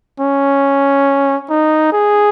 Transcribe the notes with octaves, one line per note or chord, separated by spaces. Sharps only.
C#4
D#4
G#4